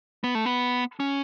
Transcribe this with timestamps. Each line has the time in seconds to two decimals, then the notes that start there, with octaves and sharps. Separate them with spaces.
0.24 B3
0.35 A3
0.45 B3
1.00 C#4